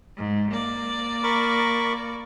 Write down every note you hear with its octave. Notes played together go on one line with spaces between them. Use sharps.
G#2
A#3 D5
A#4 B5 C#6